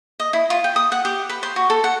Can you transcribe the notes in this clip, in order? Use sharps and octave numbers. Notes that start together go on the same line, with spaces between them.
D#5
E4
F4
G5
D#6
F#5
G4
B4
C5
F#4
A4
F#5